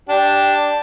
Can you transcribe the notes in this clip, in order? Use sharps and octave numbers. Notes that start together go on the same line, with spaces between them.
D4 G4